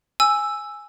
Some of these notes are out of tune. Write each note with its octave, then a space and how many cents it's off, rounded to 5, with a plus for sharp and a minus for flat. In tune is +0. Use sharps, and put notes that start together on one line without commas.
G#5 +0 E6 +0